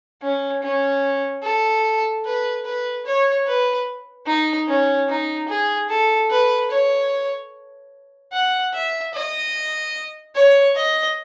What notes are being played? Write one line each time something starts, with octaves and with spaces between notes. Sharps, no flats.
C#4
C#4
A4
B4
B4
C#5
B4
D#4
C#4
D#4
G#4
A4
B4
C#5
F#5
E5
D#5
C#5
D#5